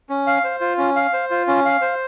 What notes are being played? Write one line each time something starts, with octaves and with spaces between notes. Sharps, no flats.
C#4
F5
C5
F4
C#4
F5
C5
F4
C#4
F5
C5